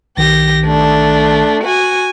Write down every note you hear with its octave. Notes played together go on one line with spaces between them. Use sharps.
B1 D#3 G4 A#6
A3 D4
F#4 G#5